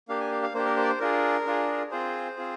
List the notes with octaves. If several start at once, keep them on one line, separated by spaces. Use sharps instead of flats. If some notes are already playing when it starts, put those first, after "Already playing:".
A#3 D4 G4 F5
G#5
F5
F5
A#3 D4 G4 C5
A#4
C5
D5
C5
D4 F4 G#4 A#4
D4 F4 G#4
C4 F4 G#4 C5
C4 F4 G#4